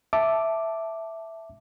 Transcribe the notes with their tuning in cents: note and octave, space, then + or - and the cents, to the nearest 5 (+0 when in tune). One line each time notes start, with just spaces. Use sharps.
E5 +0 A5 +0 D6 +0